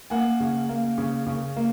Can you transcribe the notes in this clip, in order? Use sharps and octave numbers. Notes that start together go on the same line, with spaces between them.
A#3 F#5 G#5
C#3
A#3
C#3
C#3
A#3